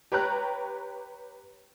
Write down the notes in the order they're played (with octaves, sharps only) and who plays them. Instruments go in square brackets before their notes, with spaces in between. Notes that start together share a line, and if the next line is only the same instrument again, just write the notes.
[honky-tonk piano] G4 B4 C#5 G5 A#5 F#6